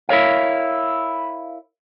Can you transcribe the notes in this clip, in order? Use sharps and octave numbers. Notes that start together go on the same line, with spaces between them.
E4 A#4 C#5 F5